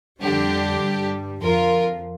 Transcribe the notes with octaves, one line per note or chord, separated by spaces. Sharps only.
F2 D3 G3 D4 G4
G2 G3
F2 F3 F4 A#4